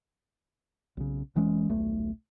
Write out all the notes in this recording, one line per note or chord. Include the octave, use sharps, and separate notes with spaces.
B1 C#3
F1 E3 G#3 C#4
D#1 B1 A3